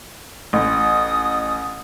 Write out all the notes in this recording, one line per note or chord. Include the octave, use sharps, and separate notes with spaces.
A1 D#6